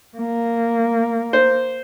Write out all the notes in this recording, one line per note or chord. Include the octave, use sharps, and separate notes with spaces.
A#3
C5